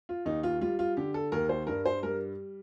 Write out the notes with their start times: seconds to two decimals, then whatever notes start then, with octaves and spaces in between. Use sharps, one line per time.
0.09 F4
0.26 D#2 D#4
0.43 F4
0.61 G3 F4
0.79 F4
0.97 D3 G4
1.14 A4
1.32 D#2 A#4
1.49 C5
1.67 G2 A#4
1.86 C5
2.03 G3 A#4